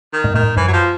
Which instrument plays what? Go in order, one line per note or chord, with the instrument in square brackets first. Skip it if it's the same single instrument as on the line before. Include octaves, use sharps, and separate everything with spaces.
[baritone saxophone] D#3
[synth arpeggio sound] G#2
[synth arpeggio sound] A2 [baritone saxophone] D#3
[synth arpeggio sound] G#2
[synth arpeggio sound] F#2 [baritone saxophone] E3
[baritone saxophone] F#3
F3